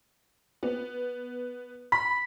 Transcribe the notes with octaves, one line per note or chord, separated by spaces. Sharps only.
B3
B5 B6